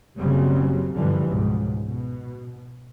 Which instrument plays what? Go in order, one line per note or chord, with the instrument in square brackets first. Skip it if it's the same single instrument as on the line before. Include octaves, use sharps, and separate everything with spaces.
[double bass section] F#1 C#3 F#3 G3 C4
G2 B2 D3 E3 F3 G3
C#2 G#2 B2
B2